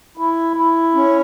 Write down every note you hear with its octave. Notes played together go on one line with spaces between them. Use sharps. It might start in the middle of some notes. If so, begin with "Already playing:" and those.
E4
E4
C#4